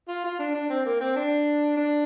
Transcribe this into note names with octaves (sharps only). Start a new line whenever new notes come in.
F4
F4
D4
D4
C4
A#3
C4
D4
D4